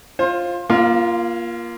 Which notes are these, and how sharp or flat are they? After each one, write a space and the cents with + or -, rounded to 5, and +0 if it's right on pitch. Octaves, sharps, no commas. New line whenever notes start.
F4 +0 C5 +25
A#3 +25 F4 -15